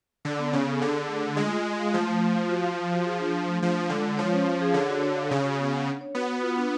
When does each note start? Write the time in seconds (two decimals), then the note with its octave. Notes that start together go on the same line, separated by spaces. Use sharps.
0.25 D3 D5
0.39 B3
0.53 C#3 B3
0.66 A4
0.80 D3 G#4
0.95 G#4
1.08 A3
1.23 A3
1.36 G#3 F4
1.52 F4
1.66 F4
1.79 F5
1.94 F3 A3
2.07 A3
2.21 A3
2.36 F4
2.49 F#4
2.64 F5
2.78 F5
2.92 F#4
3.06 G#4
3.20 D4
3.34 G#4
3.48 A3
3.62 F3 D4
3.76 F4
3.89 D3 G#3
4.04 G#3
4.18 F3 C#5
4.33 C#4
4.47 F5
4.61 G#4
4.74 D3 C#5
4.89 F#4
5.03 C#5
5.16 F5
5.31 C#3 C#5
5.44 F#4
5.59 B3
5.72 F#5
5.87 D4
6.01 C#5
6.15 B3 F#4
6.29 F#4
6.43 F4
6.57 D4